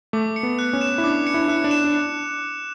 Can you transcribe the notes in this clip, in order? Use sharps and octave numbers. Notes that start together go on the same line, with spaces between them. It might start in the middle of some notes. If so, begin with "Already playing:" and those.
A3 D6
C#7
B3
F#6
C#4
E7
E4
D4 D6
C#7
E4
D4
E4 F#6
D4
E7
D4